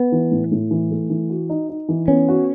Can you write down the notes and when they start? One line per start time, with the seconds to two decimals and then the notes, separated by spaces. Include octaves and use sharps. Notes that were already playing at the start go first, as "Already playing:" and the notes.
Already playing: B3
0.12 E3
0.31 A2
0.51 A2
0.71 E3
0.91 A3
1.10 E3
1.30 F#4
1.50 D#4
1.69 D#4
1.89 E3
2.08 B3 C#4
2.29 F#4